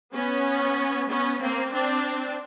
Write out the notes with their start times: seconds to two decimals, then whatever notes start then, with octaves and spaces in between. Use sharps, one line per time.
0.13 B3 C#4
1.09 B3 C#4
1.40 A#3 C4
1.73 C4 D4